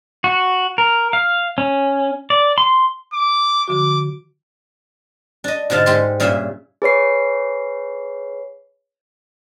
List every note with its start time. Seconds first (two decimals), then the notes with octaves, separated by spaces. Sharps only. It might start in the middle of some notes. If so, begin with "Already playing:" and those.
0.24 F#4
0.78 A#4
1.13 F5
1.58 C#4
2.30 D5
2.58 C6
3.13 D6
3.68 D3 F3 F#4 D6
5.44 D4 D#5
5.70 G#2 B2 D3 F5 A5
5.86 G#2 G#3 G4 A4 C6
6.20 G2 A#2 C#3 G#4 E5
6.82 G#4 B4 C#5 C7